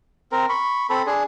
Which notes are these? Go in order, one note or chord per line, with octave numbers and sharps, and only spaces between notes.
C4 A#4
B5 C#6
C4 A4 B5
D4 G#4